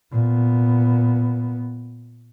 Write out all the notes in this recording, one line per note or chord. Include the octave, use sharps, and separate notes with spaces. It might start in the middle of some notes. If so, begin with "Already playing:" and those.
A#2 B3